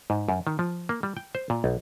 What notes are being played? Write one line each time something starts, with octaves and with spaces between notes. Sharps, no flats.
G#2
F#2
D#3
F3
A#3
G3
G5
C5
A#2
B1